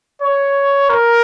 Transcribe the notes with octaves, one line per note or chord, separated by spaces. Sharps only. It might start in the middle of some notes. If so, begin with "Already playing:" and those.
C#5
A#4